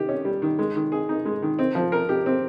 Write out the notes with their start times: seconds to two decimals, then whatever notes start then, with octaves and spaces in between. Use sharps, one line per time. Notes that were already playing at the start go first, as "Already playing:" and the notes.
Already playing: D#3 G4
0.09 C#4
0.25 G3
0.42 D#3
0.59 G#3
0.75 D#3
0.92 G#4
1.09 D#4
1.25 G#3
1.42 D#3
1.59 C4
1.75 F3
1.92 A#4
2.09 G4
2.26 C4